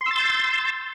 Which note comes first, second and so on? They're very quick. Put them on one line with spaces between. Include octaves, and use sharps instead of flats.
C6 E6 A6 G6